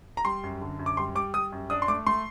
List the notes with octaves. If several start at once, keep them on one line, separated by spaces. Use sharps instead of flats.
A#5
G3 C6
F#2
D3
F#2
D6
G3 C6
G3 D6
G3 D#6
F#2
D4 D#6
C6
A3 D6
A3 C6